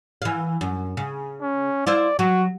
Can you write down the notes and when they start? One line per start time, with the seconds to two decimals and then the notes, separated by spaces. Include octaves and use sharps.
0.22 E3 F5
0.61 F#2
0.97 C#3
1.42 C#4
1.87 E4 F4 C5 D5
2.19 F#3 F#4